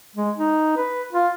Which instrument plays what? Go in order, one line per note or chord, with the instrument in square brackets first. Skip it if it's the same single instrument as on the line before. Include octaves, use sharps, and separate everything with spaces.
[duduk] G#3
D#4
B4
F4